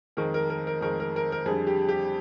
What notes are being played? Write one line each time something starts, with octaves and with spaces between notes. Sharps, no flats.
F2 D#3 G#3 A#4
A#4
A#4
A#4
F2 D#3 G#3 A#4
A#4
A#4
A#4
F2 D3 G3 G#4
G4
G4